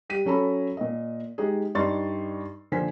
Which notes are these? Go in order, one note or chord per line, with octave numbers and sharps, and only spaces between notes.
G3 B6 D#7
F#3 C#4 A4 A#5 B5
A#2 D#5
G#3 D#4 G4 G#4
G2 D#4 D5 C6 C#6 A6
D3 F3 A#3 C5 G#5 B6